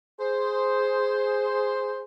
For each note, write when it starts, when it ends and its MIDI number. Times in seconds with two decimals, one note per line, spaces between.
0.20 2.03 68
0.20 2.03 72